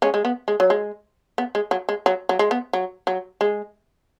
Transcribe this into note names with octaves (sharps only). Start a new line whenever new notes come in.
G#3 C#4
G#3
B3
G#3
F#3
G#3
B3
G#3
F#3
G#3
F#3
F#3
G#3
B3
F#3
F#3
G#3